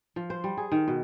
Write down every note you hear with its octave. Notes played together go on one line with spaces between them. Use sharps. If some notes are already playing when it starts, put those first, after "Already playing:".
F3
C5
G3
G#4
D#3
B2